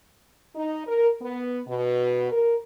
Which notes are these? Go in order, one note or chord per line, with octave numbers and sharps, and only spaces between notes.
D#4
A#4
B3
B2
A#4